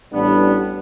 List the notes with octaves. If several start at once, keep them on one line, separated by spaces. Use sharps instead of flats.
A1 G3 B3 D4